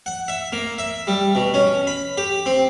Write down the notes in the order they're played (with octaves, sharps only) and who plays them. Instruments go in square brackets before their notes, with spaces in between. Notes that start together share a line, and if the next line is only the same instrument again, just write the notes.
[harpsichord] F#5
E5
A#3
E5
G3
B2
C#4
B5
G4
C4